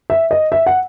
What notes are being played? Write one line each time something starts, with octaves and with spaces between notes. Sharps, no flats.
E5
D#5
E5
F#5